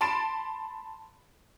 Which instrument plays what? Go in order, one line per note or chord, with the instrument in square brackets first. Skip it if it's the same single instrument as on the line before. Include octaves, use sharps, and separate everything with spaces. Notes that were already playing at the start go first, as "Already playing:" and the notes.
[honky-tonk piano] A5 B5 C6 A6 D7 E7